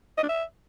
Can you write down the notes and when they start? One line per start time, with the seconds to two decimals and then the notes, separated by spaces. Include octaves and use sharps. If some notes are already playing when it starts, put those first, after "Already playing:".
0.17 D#5
0.23 D4
0.29 E5